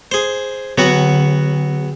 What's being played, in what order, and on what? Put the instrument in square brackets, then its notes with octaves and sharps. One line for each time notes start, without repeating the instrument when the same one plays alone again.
[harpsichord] G#4 C5
[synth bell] D3 [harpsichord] F#3 B3 F#4